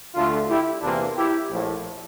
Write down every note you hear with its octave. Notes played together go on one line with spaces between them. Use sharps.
D2 D3 A3 D4 F4
E4 G4
E2 C3 E3 A#3 D4 F4
E4 G4
A#1 A2 F3